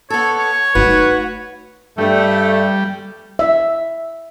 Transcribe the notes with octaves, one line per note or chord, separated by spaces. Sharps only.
B3 A4 C#5
C#5
A3 D#4 F#4 B4
G2 G3 A3
E5